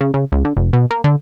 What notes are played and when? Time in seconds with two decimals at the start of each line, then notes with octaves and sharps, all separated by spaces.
0.01 C#3
0.14 C#3
0.32 C#2
0.45 D3
0.57 F1
0.73 B2
0.91 A#3
1.04 D3